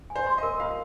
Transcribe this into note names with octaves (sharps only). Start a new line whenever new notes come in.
G#5
C5
C6
A#4 D#5
F4 F5